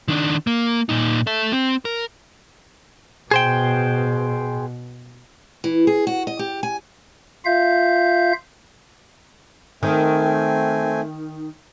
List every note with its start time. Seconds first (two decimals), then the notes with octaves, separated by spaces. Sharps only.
0.08 D#3 D4
0.47 A#3
0.89 A#2 D#4
1.27 A4 E5
1.52 C4
1.85 A#4
3.31 B2 G#4 C5 G5
5.64 E3
5.87 G#4
6.07 F#4
6.27 D#5
6.39 G4
6.63 G#5
7.45 F4 E5 F5 G6
9.83 D#3 A3 C4 G#5